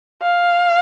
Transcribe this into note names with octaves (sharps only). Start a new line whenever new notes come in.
F5